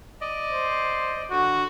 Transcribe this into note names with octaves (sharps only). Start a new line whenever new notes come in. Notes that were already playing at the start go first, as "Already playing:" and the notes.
D5 D#5
C5
D3 F#4